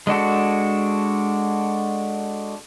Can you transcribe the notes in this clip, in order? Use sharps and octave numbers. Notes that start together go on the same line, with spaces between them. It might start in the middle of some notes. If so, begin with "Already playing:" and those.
G#3 D4 F#4 A4